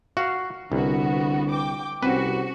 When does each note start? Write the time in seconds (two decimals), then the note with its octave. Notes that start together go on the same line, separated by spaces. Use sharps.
0.17 F#4 F5 F#5
0.72 C2 D3 B3 F#4
1.50 G5 D6
2.03 C2 C4 C#4 F#4 B4